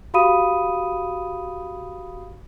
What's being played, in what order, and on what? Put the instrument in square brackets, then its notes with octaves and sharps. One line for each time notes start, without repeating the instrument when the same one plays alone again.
[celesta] F#4 G4 F5 B5 D#6 D#7